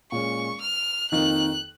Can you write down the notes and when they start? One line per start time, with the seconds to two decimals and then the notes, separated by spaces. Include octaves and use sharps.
0.12 A#2 G#3 C#4 C#6
0.62 F6
1.12 F2 D#3 A#3 D#4 F#6